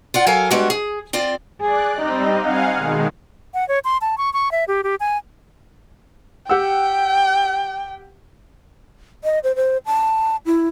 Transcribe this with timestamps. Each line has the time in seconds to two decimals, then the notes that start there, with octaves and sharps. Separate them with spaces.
0.14 F4 D5 F#5
0.27 F#3 A4 A#4 F5 G#5
0.51 G3 G#3 B3 D4 F#4
0.70 G#4
1.13 C4 F4 D5
1.61 G#4 D5 F#6
1.98 G3 C4 D#4 D#5
2.37 F5 F#5 G#5
2.76 B2 D#3 G#3
3.54 F#5
3.69 C#5
3.84 C6
4.01 A5
4.18 C#6
4.33 C#6
4.52 E5
4.68 G4
4.84 G4
5.00 G#5
6.49 G4 F#5 G5 E6
9.24 D#5
9.44 C5
9.56 C5
9.86 A5
10.46 E4